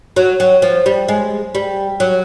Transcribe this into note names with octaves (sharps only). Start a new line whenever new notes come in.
F#3
F#3
F3
G3
G#3
G3
F#3